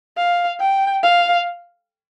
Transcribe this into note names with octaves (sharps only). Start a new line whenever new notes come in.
F5
G5
F5